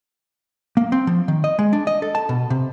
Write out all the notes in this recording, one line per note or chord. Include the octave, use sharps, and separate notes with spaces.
A#3
C4
F3
D#3
D#5
G#3
D4
D#5
A4
A5
B2
C3